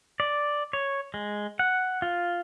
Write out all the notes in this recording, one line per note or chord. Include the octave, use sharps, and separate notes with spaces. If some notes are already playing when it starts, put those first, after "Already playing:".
D5
C#5
G#3
F#5
F4